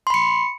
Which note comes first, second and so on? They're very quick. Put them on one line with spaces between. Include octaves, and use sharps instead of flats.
C6 B5 C#7